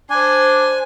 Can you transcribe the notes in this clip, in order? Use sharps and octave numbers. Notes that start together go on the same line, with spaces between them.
D4 C5 G#5 C6